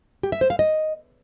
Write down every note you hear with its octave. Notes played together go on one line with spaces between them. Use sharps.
G4
E5
C5
F5
D#5